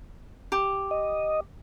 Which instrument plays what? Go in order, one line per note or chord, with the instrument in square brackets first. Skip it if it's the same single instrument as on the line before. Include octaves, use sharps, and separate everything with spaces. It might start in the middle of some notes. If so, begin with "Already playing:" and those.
[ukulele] G4
[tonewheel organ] D#5